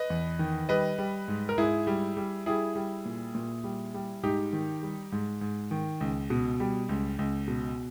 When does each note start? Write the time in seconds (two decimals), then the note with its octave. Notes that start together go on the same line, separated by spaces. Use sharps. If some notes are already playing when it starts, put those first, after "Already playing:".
Already playing: B4 D#5
0.10 E2
0.39 D#3
0.69 G3 B4 D#5
0.98 G3
1.28 G#2
1.49 A#4
1.58 G#2 E4 G#4
1.87 G3
2.17 G3
2.46 G3 E4 G#4
2.76 G3
3.05 A#2
3.35 A#2
3.64 G3
3.94 G3
4.23 G#2 D#4 G4
4.53 D#3
4.83 G3
5.12 G#2
5.41 G#2
5.71 D#3
6.00 C#2
6.30 B2
6.60 G3
6.89 C#2
7.19 C#2
7.48 B2